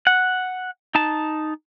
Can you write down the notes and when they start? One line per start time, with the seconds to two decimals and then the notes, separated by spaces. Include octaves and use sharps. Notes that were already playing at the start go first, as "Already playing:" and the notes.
0.07 F#5
0.95 D#4 A5